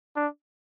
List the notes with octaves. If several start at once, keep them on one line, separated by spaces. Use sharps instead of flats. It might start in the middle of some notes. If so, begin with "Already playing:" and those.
D4